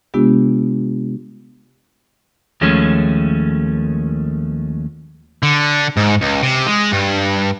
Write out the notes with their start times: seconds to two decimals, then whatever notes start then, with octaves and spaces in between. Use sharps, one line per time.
0.14 C3 G#3 B3 D4 F4 G4
2.61 D#2 F3 G#3 A3 C#4
5.43 D3
5.97 G#2
6.22 C#2
6.43 C3
6.67 G#3
6.92 G2